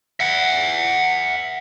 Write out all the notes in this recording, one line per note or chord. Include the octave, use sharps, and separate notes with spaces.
E5 F#5